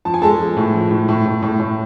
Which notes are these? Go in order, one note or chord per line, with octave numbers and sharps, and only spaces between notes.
F3 A5
G#5
G#3 A4 A5
F3
A2
F3
A2
A2
A2
A2
A2